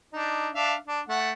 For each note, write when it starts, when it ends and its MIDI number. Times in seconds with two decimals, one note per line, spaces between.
0.13 0.49 62
0.13 0.49 63
0.55 0.75 62
0.55 0.75 76
0.55 0.75 77
0.87 1.00 62
1.09 1.31 57
1.09 1.31 78